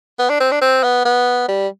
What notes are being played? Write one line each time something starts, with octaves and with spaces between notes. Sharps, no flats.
B3
D4
C4
D4
C4
B3
B3
G3